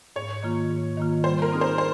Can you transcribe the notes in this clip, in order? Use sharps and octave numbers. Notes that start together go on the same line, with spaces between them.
G#2 C#5
D#3 A#3 F4
G#2
D#3 A#3 F4
G3 C5
A#4
C4 D#4 G#4
C5
C5